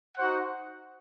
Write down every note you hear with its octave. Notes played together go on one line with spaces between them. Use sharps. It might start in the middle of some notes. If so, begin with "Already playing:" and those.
D#4 F#4 C5 F#5